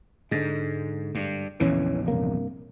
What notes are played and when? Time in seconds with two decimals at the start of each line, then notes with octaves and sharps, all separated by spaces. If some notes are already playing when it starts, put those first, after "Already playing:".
0.31 G#2 D3 G#3
1.15 G2
1.60 A#1 E2 C#3 E3 C#4
2.08 G2 C3 A#3